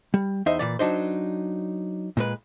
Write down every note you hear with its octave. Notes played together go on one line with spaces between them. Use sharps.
G3
E2 D#4 C5 D#5 E5
A#2 E3 D5
F#3 D4 D#4 C5
A#2 G#3 B4